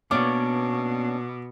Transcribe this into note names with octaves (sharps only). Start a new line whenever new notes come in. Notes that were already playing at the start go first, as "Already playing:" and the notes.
B2 A#3 B3 C#4 D4 C#5 D6